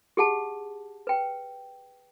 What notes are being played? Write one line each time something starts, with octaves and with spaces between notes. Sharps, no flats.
G4 G#4 F#5 A5
B4 G5